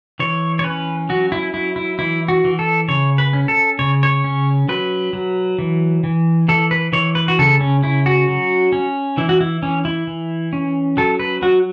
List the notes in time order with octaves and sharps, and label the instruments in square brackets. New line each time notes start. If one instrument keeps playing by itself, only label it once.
[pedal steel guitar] E3 C#5
C#5
C#4 B4
F#3 F#4
E4
F#3 E4
E4
E3 E4
F#4
E3
A4
C#3 C#5
B4
C#4
A4
C#3 C#5
C#5
C#4
F#3 B4
F#3
E3
E3
E3 A4
B4
E3 C#5
B4
F#4
C#3 A4
C#4
C#4 E4
F#4
F#3
C#4
E3 E4
F#4
E4
E3 C#4
E4
E3
C#4
F#3 A4
B4
F#3 F#4